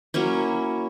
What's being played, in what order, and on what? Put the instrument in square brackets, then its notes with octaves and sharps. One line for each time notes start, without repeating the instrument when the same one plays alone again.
[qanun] F#3 A#3 C#4 E4